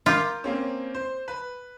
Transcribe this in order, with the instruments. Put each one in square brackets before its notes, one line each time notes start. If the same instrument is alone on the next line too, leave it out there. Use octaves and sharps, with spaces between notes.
[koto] F4 [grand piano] A#4 D6 G6
[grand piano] A#3 C4 C#4
C5
B4